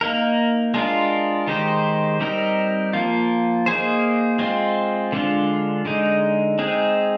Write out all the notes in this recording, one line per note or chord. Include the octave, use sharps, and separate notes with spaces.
A#3 D#4 A#4
G#3 D4 F4 A#4
D#3 G#3 D#4 G4 C5
G3 C4 D#4 A#4
F3 A#3 F4
A#3 D#4 G#4 C5
G#3 C4 F4
D3 G#3 D4 F4
D3 G#3 D#4
G#3 C4 D#4 G#4